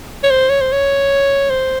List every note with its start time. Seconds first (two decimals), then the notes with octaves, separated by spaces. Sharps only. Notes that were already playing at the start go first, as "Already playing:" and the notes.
0.24 C#5
0.30 C5
0.50 C#5
0.61 C5
0.72 C#5
1.50 C5